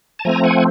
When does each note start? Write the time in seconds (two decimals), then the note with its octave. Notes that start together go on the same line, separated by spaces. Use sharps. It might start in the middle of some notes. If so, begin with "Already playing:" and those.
0.19 A5
0.25 F3 A3 C4 G#5 A#5
0.44 F#5 G#5